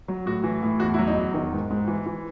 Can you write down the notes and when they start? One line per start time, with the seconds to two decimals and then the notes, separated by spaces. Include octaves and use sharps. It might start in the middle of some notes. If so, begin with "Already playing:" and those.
0.08 F#3
0.26 A2 F#4
0.44 E3
0.63 A2
0.80 E2 F#4
0.94 E4
0.99 F#3
1.07 D#4
1.17 E2
1.34 D#3
1.52 G#2
1.70 G#2
1.88 E3
2.06 E3